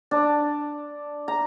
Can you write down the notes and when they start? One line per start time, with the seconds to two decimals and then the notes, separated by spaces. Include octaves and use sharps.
0.11 D4
1.28 A#5